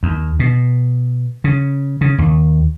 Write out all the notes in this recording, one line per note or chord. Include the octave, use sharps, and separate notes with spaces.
D#2
B2
C#3
C#3
D#2